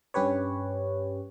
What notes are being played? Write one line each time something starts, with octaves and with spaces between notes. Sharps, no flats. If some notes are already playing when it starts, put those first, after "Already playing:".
G2 C#4 G4 B4 C#5